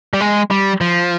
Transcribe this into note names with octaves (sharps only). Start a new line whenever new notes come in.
G3
G#3
G3
F3